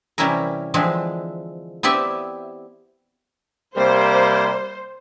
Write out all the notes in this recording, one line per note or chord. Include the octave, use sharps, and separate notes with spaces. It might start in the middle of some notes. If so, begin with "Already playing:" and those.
C3 E3 G3 C#4 E4 A#4
D3 E3 F3 G#3 C4
B3 C4 E4 G4 D5 E5
C3 G3 A#3 C5